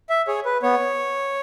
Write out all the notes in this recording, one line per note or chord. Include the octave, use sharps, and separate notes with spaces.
E5
G#4 C#5
B4
B3 C#5